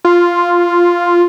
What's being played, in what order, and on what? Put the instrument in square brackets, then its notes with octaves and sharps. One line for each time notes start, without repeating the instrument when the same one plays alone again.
[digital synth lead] F4